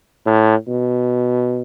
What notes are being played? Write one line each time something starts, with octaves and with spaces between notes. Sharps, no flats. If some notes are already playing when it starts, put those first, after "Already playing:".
A2
B2